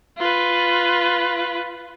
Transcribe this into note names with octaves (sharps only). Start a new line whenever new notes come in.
F4 B4